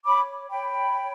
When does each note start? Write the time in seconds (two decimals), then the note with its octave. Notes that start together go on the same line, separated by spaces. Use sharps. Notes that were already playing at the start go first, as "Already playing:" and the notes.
0.06 C#5 B5 D6
0.49 C#5 G5 B5